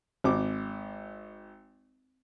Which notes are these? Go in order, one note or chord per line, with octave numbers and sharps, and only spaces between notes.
G#1 D6